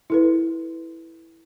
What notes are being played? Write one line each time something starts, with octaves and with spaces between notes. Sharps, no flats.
E4 A4 B4